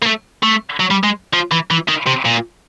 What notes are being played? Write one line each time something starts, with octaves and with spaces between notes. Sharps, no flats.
A#3
A3
A3
F#3
G3
G#3
F3
E3
E3
D#3
C3
A#2